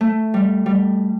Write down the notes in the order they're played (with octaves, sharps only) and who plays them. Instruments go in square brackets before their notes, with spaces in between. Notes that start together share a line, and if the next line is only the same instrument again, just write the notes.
[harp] A3
G3
G3